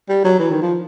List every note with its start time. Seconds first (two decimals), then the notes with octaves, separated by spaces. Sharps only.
0.09 G3
0.24 F#3
0.39 E3
0.50 D#3
0.62 F3